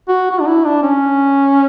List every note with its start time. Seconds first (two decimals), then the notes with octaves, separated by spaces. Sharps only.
0.09 F#4
0.31 F#4
0.40 D4
0.48 E4
0.66 D4
0.83 C#4